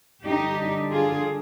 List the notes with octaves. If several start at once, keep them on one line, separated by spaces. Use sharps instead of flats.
D3 G3 D4 D#4 G4
F4 G#4